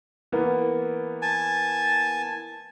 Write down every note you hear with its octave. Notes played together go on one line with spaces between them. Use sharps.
E3 A#3 B3
G#5 A5